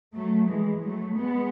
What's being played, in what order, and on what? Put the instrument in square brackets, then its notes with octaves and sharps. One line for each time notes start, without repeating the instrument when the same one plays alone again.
[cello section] F#3 A3
E3 G#3
F#3 A3
G#3 B3